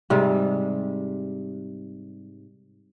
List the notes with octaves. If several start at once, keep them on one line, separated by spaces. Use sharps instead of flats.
G#2 C3 G3